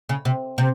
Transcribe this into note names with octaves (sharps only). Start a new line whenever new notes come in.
C#3
C3
C3